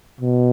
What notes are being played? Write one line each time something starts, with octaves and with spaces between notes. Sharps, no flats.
B2